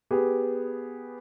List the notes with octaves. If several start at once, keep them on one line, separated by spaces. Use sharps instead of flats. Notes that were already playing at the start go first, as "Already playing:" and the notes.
B3 G4 G#4